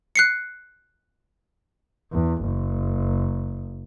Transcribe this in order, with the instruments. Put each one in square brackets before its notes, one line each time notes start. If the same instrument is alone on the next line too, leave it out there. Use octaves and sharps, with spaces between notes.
[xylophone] F#6 C7 C#7
[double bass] E2
F#1